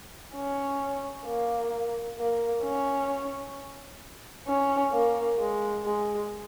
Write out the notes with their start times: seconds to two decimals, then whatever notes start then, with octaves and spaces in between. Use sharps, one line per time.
0.35 C#4
1.26 A#3
2.19 A#3
2.64 C#4
4.47 C#4
4.92 A#3
5.39 G#3
5.85 G#3